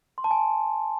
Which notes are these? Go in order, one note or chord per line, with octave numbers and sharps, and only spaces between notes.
C6
A5
G#5